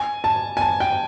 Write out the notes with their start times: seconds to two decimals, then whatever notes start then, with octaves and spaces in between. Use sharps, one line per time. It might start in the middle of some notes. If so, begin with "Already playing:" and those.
Already playing: G#5
0.24 A5
0.57 G#5
0.61 A5
0.80 G5